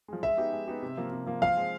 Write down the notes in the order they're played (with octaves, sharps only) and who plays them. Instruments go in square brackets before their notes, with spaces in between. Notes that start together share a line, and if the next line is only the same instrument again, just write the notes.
[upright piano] F3 G#3
[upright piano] G#3 [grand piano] E5
[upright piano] B3 D#4 G4
G#3
B3 D#4 G4
C3
F3 A#3
C3
F3 A#3
[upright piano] F3 [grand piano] F5
[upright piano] G#3 C4